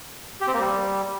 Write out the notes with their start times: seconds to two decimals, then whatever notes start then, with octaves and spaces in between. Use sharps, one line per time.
0.41 G4
0.47 C4
0.54 A#3
0.60 G3